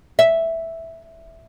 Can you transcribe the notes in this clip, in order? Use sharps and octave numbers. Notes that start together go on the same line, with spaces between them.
E5